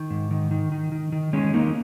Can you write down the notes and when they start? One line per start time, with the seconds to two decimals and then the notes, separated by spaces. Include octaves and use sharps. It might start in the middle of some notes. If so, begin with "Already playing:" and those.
Already playing: D#3
0.10 G#2
0.31 D#3
0.51 D#3
0.72 D#3
0.92 D#3
1.12 D#3
1.33 D#3 G#3 C#4
1.54 D#3 A#3 D#4